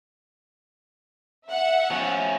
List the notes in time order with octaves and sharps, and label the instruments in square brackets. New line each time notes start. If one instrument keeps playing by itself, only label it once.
[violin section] E5 F#5
[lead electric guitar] F3 C#4